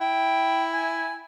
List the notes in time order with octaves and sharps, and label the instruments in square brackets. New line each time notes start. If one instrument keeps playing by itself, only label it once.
[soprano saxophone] E4 [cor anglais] G5
[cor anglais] G#5